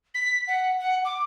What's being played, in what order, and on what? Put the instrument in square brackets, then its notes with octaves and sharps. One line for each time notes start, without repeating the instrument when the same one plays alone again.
[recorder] B6
F#5
F#5
D6